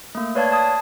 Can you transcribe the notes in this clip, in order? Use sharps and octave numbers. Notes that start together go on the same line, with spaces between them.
A3 A#3
B4 C#5 D5 F5 A5 G#6
A5 D#6